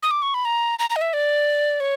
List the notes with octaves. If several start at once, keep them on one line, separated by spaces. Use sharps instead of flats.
D#6
D6
C#6
B5
A#5
A#5
A#5
D#5
E5
D5
C#5